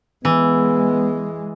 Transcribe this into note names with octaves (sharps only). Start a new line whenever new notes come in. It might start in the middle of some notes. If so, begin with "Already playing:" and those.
E3 G#3 B3